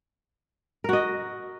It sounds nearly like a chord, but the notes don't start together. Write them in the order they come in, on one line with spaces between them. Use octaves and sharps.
A#4 F#4 D#5